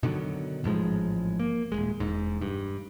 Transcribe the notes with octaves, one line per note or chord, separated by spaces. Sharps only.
B2 D3 D#3 F#3
A1 G#2 F3 G#3
A#3
D#1 G#1 G#3
E1 G#2
G2